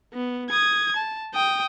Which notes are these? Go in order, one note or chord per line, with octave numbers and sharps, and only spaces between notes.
B3
D#6 G#6
A5
G5 D#6